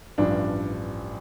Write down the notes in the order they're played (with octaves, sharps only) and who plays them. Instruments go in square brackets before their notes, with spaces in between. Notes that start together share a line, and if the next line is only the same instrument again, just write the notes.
[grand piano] A1 G2 F3 D4